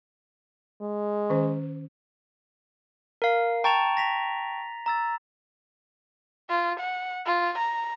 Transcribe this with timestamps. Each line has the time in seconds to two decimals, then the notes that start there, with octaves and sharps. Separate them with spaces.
0.82 G#3
1.30 D#3 C#4 C5
3.22 A#4 F5
3.64 G5 A5 A#5 C#6 A6 F7
3.97 A#6 B6 F7
4.86 A#5 E6 A6
6.50 F4
6.80 F#5
7.26 F4
7.58 A#5